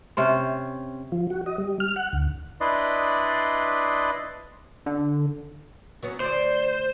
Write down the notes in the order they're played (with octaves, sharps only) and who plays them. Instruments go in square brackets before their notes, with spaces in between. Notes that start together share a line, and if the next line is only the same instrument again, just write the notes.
[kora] C3 C#4 C5
[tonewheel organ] F3
F#4
D#5
G3
F6
F#5
D2
[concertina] D4 E4 B4 D5 D#5 C6
[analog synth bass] D3
[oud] F#3 B3 C#4
[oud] D2 D5 [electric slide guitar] C5